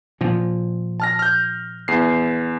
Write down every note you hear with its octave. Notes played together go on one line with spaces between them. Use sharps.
A#2 F3
A5 F6 A#6
F6 G6
E2 C7